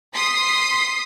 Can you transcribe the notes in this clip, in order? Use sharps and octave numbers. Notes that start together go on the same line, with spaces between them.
C6 D#6 B6 C7